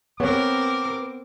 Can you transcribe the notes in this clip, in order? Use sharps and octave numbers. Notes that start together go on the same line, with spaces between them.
B3 C4 A#4 C#5 D6